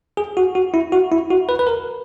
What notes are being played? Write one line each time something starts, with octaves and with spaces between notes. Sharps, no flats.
G#4
F#4
F#4
E4
F#4
E4
F#4
B4
B4
A#4